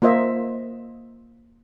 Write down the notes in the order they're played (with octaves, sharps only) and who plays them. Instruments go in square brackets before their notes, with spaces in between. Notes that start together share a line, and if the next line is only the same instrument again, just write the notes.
[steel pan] A#3 F4 C5 D#5 E5